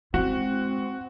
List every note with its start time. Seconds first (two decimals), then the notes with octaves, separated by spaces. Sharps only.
0.14 G#3 C4 E4 F#4